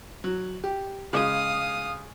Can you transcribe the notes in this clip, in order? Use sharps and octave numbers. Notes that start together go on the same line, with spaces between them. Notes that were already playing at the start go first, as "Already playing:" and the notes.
F#3
G4
C#3 G#3 F5 D#6